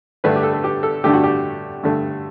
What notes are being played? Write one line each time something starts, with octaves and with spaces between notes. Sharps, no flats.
G2 D3 A3 B4
G4
A4
A4
G4
A4
G2 D3 A3 G4
F#4
G4
G2 D3 A3